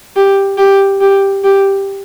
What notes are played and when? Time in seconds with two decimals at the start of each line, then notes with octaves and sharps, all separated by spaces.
0.16 G4
0.58 G4
1.01 G4
1.44 G4